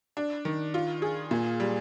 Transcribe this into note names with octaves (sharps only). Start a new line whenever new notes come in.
D4
D#3
F4
G#4
A#2
G3